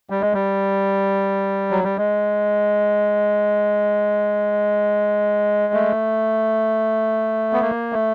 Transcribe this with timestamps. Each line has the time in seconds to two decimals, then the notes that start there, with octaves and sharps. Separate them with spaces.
0.10 G3
0.22 G#3
0.33 G3
1.71 F#3
1.84 G3
1.98 G#3
5.74 A3
7.53 B3
7.62 A#3
7.93 A3